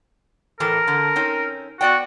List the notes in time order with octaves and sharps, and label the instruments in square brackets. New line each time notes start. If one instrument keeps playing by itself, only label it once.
[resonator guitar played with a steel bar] A2 E3 A4 [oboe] A#4
[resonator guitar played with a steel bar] D3
C4 C#4 D#4
[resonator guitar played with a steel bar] B3 D5 G5 [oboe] F#4